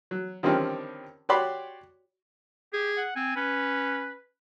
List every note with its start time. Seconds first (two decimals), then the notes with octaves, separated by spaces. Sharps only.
0.11 F#3
0.43 D3 D#3 F3 G3 C4 C#4
1.29 F#4 G4 C#5 D5 B5 C6
2.73 G4 G#4
2.97 F#5
3.16 C4 G#5
3.36 C#4 B4